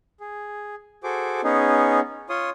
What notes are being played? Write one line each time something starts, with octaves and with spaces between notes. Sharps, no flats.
G#4
F#4 G#4 A4 C5 D6
B3 C#4 D#4 G#4
F4 C#5 C6 D#6